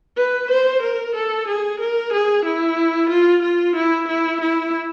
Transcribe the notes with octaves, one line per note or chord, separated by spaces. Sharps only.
B4
C5
A#4
A4
G#4
A#4
G#4
E4
F4
F4
E4
E4
E4